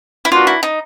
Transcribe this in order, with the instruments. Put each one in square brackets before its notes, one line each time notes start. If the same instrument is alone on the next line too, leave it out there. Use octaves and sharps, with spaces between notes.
[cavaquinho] E4
[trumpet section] A#3 D4 F#4 B4 [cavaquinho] F4
[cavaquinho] E4
D#4